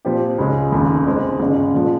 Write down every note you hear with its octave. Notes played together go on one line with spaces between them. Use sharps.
A#2 F3 C4 G4
C#2 C#3 G#3 C#4 G#4
F1 D#2 C#3 G#3
D#2 D#3 G#3 C4
G1 F2 C#3 G#3 C#4
A#2 F3 G#3